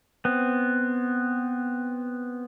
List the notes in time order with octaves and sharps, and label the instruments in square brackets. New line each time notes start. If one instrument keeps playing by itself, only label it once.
[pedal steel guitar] B3 C4